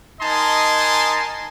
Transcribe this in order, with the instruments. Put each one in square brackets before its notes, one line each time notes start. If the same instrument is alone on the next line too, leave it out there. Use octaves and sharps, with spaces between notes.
[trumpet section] D#4 A#4 D#5 G#5 A5 C6